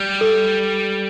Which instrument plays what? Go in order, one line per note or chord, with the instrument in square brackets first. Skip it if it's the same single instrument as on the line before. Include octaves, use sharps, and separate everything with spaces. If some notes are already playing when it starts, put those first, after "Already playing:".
Already playing: [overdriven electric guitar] G3
[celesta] A4